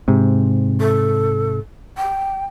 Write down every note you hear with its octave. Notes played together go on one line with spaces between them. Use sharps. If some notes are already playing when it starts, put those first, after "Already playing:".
G#2 C3
A4
G5